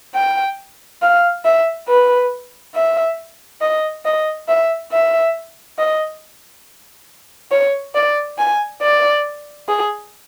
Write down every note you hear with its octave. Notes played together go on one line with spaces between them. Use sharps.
G5
F5
E5
B4
E5
D#5
D#5
E5
E5
D#5
C#5
D5
G#5
D5
G#4